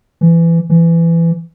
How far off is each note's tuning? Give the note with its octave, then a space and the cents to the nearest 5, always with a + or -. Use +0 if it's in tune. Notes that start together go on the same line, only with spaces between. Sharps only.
E3 +20
E3 +20